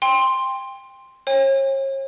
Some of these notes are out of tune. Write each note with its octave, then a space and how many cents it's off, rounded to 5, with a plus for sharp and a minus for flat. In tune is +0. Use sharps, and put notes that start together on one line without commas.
G5 +20 C6 +0
C#5 -40 G5 +45